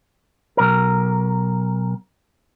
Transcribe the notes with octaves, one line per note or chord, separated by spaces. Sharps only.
B1 A#4